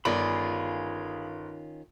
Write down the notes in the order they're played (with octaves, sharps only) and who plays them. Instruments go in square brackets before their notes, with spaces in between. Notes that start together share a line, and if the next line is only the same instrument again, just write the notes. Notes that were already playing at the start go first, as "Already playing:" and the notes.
[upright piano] G1 D5 [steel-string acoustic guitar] D#3 C#4 F4 [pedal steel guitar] G#4 B5